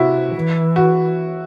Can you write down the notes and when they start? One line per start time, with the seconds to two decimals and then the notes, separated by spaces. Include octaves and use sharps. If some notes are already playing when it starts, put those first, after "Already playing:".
Already playing: C3 E4 F#4
0.35 E3
0.76 F#4